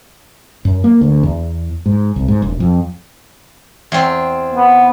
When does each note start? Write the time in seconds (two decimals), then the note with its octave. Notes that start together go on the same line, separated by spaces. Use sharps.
0.65 F#2
0.84 A#3
1.01 D2
1.23 E2
1.86 G#2
2.16 C2
2.28 G#2
2.42 E1
2.60 F2
3.92 E2 C4
4.52 B3